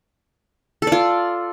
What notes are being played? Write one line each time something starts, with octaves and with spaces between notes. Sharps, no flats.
F4 A4 D5